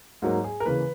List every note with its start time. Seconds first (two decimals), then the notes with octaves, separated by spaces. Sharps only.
0.22 G#2 F#3 A#3
0.44 G#4
0.60 A#4
0.65 C#3 E3 A#3 B4